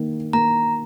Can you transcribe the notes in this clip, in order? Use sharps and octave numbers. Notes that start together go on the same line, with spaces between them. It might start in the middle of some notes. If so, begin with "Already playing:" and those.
Already playing: D#3 A#3
A#3 A#5